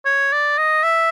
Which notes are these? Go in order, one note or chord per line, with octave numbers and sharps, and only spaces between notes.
C#5
D5
D#5
E5